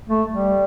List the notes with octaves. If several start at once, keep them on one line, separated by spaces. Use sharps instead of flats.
A3
G3